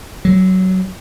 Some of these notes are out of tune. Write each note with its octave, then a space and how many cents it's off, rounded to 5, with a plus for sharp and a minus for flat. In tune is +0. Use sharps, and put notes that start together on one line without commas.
F#3 +15